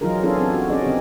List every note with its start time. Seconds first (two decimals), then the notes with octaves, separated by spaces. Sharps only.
0.01 E3 F#3 D#4 F4 G#4 A#4
0.22 B3 C#4 D4 F4 G#4 A4
0.38 C4 A4
0.50 F4 F#4
0.69 C#4 D#4 F#4 G#4 D5 D#5
0.83 C#3 B3 C4 D#4 G4